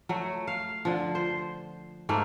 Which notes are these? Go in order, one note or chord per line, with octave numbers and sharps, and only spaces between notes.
F#3 A3
F5
D3 F3
C5
G#2 A3 A#3